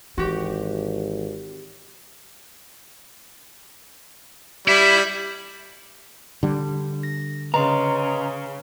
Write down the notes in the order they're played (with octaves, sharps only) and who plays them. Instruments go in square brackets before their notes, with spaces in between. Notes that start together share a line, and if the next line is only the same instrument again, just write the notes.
[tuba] G#1 [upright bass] E3 [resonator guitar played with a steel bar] F#4 G4
[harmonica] G3 [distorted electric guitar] E4 E5
[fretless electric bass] D3 G3
[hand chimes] A#6
[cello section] C#3 [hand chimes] B4 D#5 C6 [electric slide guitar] A#5